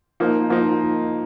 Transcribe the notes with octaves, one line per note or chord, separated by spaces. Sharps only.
F3 A#3 D#4
F3 A#3 D#4